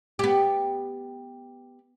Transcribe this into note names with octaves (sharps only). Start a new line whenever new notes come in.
B3 G4